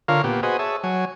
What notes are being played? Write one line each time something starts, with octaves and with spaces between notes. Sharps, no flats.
D3 F4 A#4 C#5 F5
A#2 B3 G4
F#4 G#4 B4 C5 D#5 G#5
G#4 C#5 E5 A5
F#3 C#5 G#5